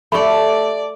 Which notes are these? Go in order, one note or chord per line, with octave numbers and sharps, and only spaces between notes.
A3 G4 A4 D5 B5 C#6